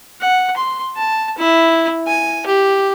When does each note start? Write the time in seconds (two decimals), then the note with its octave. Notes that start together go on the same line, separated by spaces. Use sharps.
0.20 F#5
0.56 C6
0.96 A5
1.38 E4
2.07 G#5
2.46 G4